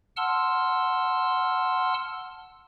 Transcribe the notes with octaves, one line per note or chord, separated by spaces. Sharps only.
F#5 A5 C6 E6 F6